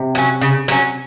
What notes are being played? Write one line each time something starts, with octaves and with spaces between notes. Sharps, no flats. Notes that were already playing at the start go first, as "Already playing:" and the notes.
Already playing: C3
F#3 C#4
C#3
F#3 C#4